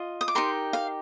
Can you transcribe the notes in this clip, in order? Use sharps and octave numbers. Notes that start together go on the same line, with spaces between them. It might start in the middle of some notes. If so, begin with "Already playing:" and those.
Already playing: F4 D#5
D#6
D6
D#4 G4 A#4 C6
F5